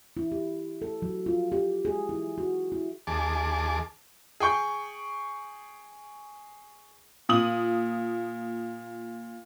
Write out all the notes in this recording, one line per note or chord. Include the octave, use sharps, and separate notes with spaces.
E4
G4
A4
F#3
F4
G4
G#4
E4
F#4
E4
D#2 G#4 A5 D6
G#4 G5 C#6 G6
A#2 D#6 F#7